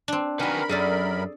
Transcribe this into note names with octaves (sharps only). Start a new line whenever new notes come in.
C4 D4
D#3 F#3 A#4 B4 F#5 G#5 B5
F#2 G#4 A4 D5